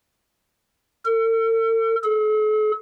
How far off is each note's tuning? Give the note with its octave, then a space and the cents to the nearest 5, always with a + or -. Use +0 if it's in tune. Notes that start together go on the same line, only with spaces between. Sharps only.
A4 +45
A4 -45